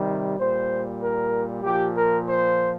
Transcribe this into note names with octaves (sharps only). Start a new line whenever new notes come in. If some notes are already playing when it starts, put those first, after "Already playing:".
Already playing: C3 D#3 G3
A#2 G3 C5
A#4
A#2 F3 G4
A#4
C5